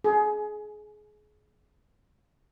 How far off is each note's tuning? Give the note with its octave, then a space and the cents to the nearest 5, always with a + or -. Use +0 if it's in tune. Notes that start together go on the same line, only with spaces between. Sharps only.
G#4 +25